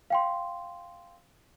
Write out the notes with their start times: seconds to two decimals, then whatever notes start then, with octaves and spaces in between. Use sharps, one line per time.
0.10 F5 G5 C6